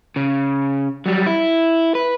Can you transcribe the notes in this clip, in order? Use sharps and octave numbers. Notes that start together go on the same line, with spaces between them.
C#3
F#3 G3
E4
B4